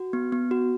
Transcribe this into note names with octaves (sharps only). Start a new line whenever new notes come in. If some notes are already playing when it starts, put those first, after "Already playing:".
Already playing: F#4
B3
B3
F#4